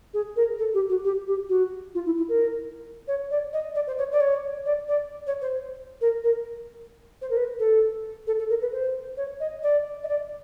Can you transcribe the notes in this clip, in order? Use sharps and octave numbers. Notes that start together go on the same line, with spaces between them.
G#4
A#4
A4
G4
F#4
G4
G4
F#4
F4
E4
E4
A#4
C#5
D5
D#5
D5
C5
C#5
D5
C#5
D5
D5
C#5
C5
A#4
A#4
C5
A#4
B4
A4
A4
A4
A#4
B4
C5
C#5
D#5
D5
D#5
D5